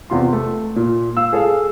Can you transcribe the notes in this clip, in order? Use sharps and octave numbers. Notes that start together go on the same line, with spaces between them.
E2 C3 F4 C6
A3
A#2
F5 E6
G#4 A4 F5